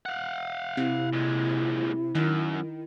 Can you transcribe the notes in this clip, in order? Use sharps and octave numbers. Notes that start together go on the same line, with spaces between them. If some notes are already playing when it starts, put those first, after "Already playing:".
F5 F#5
C3 E4
A#2 G#3
F#2 D#3